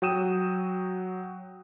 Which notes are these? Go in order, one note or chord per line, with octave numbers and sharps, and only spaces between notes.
F#3 F#4 G5 D#6 D#7 E7